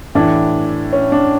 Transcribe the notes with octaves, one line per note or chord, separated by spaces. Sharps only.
A2 E3 D4
C#4
D4